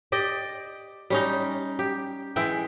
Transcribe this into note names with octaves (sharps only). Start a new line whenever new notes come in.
G4 D5 D#5
G3 C#4 D#4
G4
E3 G#3 E5 G5